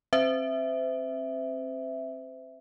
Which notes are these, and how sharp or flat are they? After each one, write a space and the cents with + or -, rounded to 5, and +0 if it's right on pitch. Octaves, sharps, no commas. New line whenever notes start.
C4 +25 C5 -35 E5 +0